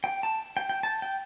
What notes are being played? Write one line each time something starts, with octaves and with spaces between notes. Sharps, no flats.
G5
A5
G5
G5
A5
G5